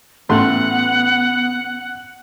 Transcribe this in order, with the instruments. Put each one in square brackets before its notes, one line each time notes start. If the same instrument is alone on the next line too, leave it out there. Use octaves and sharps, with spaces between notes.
[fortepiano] A1 A3 C6 [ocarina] B3 [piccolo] F#5